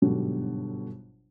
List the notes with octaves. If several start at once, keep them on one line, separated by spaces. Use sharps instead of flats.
G1 G#2 B2 D3 F#3 G3